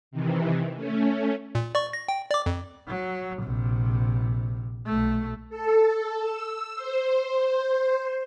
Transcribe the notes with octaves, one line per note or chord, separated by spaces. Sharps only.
C3 D#3 E3
A3 C#4
A#2
D5 C#6
A#6
G5
D5 D6
F2
F#3
A#1 C3
B1 A3
A4
E6
C5